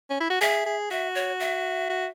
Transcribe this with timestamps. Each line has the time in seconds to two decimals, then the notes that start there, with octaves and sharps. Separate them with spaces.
0.10 C#4
0.20 E4
0.30 F#4
0.41 G#4 E5
0.66 G#4
0.90 F#4 E5
1.15 C#5
1.40 E5
1.90 F#4